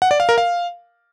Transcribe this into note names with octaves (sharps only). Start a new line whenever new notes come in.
F#5
D5
F5
A#4
F5